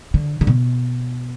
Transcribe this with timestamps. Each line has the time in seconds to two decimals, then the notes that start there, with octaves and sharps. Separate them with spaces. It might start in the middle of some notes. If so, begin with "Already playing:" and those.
0.14 D3
0.41 D3
0.47 B2